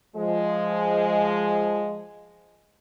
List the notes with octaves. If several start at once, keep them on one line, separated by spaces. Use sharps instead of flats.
F3 G#3